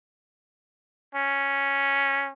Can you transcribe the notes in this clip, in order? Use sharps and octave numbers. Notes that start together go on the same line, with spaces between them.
C#4